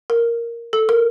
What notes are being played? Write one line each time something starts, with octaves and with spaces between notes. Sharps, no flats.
A#4
A4
A#4